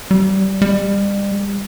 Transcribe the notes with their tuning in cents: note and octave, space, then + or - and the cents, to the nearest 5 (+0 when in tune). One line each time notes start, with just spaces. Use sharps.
G3 -25
G3 +35